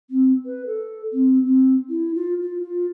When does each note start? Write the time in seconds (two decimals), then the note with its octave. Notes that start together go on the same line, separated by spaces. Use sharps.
0.10 C4
0.46 B4
0.67 A4
1.13 C4
1.44 C4
1.89 E4
2.15 F4
2.42 F4
2.62 F4